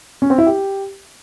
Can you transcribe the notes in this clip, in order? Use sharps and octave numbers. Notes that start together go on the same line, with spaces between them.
C#4
C4
E4
G4